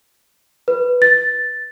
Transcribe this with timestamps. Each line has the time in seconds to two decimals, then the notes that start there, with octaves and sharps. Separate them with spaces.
0.68 B4
1.02 A6